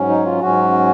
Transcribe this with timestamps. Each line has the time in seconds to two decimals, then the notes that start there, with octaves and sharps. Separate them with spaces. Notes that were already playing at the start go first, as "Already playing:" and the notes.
Already playing: G#2 F#3 C#4
0.09 D#4
0.26 F4
0.41 G#2 F#3 C#4 F#4